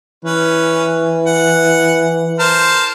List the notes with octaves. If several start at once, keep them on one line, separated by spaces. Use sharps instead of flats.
E3 C#4 B4
F#5
A#4 C5 A5